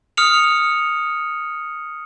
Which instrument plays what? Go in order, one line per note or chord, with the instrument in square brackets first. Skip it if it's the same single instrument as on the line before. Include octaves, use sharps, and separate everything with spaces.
[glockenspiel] D#6 F6 C#7 F7